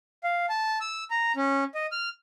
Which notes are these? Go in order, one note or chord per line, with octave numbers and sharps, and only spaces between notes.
F5
A5
E6
A#5
C#4
D#5
F6